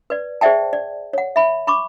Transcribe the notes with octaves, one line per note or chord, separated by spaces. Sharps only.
B4 D5
G#4 C5 D5 E5 G5 A5
D5
C#5 F#5
E5 B5
B5 C#6 D6